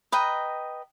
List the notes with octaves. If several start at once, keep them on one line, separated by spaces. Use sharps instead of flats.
B4 D#5 G5 A#5